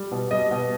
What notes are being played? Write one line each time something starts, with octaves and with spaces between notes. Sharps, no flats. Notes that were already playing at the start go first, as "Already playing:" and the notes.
Already playing: G3
B2
G3 D#5
B2